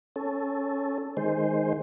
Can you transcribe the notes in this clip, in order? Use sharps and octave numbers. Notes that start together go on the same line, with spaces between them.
C#4 A4
D#3 G#3 C5